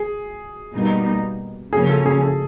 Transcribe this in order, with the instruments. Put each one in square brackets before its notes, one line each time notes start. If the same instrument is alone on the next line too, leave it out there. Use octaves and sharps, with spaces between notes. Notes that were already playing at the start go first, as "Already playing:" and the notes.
Already playing: [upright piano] G#4
[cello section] B2 G3 A#3 D#4
[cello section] C#3 F3 A#3 C#4 [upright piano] G#4
[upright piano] A4
G#4
A4